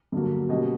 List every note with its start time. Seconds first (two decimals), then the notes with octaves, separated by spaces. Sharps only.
0.12 G2 D3 F#3 A#3
0.49 B2 G3 A#3 C#4 D#5